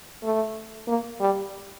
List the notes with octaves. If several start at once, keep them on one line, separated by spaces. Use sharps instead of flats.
A3
A#3
G3